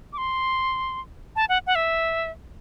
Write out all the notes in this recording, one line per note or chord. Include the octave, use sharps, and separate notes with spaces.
D6
C6
A5
F#5
F#5
E5